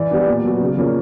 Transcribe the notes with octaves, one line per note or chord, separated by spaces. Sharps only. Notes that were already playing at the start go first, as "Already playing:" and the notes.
Already playing: E3 D5
G3 B3 D4
A#2
F#3 B3
C#3
F3 A#3 C#4